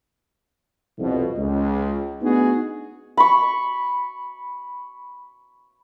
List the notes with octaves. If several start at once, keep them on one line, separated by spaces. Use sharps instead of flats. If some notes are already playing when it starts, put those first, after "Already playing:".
C2 F2 B2
C#2
A3 B3 D4 D#4 F#4 G#4
B5 C#6